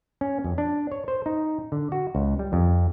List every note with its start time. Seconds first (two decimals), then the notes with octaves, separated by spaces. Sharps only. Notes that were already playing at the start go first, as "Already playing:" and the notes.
0.21 C#4
0.44 F2
0.58 D4
0.92 C#5
1.08 C5
1.26 D#4
1.72 D3
1.92 F#4
2.15 C#2
2.39 G3
2.53 F2